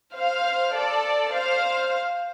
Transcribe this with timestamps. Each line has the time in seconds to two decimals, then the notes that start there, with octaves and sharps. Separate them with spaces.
0.14 C5 F5
0.75 A4 D5
1.34 C5 F5